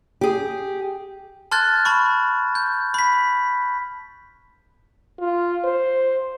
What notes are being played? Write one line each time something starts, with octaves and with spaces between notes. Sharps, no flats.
G4 G#4
A5 C6 F6 F#6 G#6 A6
A5 B5 C#6
G6
B5 B6
F4
C5